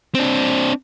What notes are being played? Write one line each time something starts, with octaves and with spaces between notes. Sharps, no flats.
C4 D4